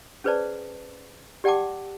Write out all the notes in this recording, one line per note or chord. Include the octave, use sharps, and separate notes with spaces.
C#4 G#4 B4 C5 D5 A5
G4 D5 F#5 G5 A5 D6